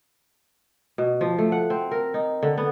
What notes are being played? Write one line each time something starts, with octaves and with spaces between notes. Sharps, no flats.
B2
F3
A3
F#5
C4
A#4
D#4
D3
B3